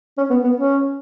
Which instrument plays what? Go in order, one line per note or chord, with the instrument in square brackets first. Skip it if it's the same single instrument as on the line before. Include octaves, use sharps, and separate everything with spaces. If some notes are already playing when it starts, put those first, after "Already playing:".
[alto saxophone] C#4
B3
B3
C#4